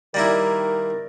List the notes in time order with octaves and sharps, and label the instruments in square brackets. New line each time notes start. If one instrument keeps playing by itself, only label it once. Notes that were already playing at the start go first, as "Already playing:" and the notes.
[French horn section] D#3 A#4 [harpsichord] G3 A#3 E4